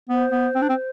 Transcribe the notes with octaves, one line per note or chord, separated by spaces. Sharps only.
B3 C5
B3
C4
D4
C4